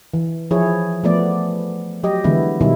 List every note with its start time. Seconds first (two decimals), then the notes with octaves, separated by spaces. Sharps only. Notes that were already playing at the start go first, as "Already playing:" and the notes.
0.14 E3
0.51 F3 E4 G#4 C#5
1.04 F3 A3 B3 D5
2.03 F#3 G4 D#5
2.24 D3 E3 G#3 B3 E4
2.61 B2 D#3 F#3 G3 D#4 E4